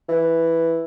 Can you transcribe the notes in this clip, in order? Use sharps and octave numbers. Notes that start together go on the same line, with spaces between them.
E3